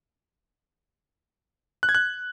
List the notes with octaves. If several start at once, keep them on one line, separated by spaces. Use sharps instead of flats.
F#6
G#6
F#6